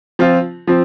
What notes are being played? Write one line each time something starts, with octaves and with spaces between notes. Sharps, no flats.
F3 C4 F4
F3 C4